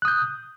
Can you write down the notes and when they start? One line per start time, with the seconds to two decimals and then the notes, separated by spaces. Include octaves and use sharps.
0.02 F#6
0.05 D#6
0.08 G6